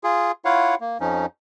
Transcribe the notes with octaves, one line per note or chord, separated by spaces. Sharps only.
F4 G#4
E4 F4 C#5 F5 F#5
A#3
F2 F3 C#4 D#4